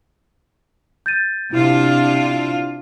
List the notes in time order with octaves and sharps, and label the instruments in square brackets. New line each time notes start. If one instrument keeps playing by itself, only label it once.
[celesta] G6 A6 D#7
[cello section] C3 D4 F4 [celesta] E4